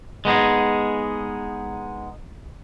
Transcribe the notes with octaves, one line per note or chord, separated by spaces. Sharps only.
G#3 B3 D#4 G#4